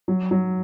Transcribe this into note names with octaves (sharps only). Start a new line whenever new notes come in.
F#3
F#3